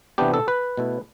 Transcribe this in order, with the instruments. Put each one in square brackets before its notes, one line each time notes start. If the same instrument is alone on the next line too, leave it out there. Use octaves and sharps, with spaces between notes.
[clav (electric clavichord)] C3 E3 B3 D4 G4
A4
B4
B2 A3 E4